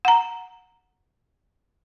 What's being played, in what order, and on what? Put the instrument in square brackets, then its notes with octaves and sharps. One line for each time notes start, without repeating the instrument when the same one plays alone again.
[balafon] F#5 A#5